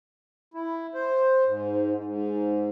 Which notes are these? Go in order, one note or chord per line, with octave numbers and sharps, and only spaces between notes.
E4
C5
G#2
G#2